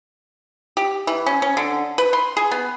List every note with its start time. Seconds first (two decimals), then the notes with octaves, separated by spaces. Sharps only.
0.77 G4
1.07 E3
1.26 C#4
1.42 C#4
1.57 D3
1.98 B4
2.13 C6
2.37 G#4
2.51 B3